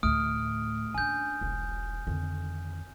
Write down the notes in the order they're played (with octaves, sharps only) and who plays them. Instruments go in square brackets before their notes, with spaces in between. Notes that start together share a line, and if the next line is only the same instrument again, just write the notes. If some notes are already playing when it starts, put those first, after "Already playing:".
[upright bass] D2 A2 [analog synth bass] A3 [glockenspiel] D#6 F6 D7
[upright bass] C#4 D4 [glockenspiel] G#5 G6
[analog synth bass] E1 [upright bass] B1
[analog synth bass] F2 [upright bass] D3 D#3